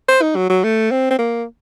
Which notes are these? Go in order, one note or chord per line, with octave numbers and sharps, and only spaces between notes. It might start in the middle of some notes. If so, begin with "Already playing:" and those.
C5
D#4
F#3
F#3
A3
C4
C4
A#3